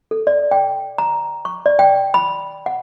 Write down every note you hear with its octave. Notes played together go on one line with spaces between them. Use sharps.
A4
D5
G5
A#5
C#6
D5
G5
B5
F#5